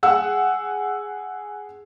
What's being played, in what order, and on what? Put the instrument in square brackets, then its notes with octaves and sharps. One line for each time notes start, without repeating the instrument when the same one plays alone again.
[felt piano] G#4 F#5 E6